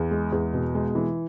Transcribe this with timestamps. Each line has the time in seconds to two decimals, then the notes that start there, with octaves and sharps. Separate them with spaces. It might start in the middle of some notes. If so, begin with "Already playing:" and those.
Already playing: E2
0.11 G#3
0.32 E2
0.53 B2
0.75 G#3
0.95 E3